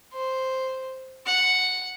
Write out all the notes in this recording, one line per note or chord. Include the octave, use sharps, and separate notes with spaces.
C5
F#5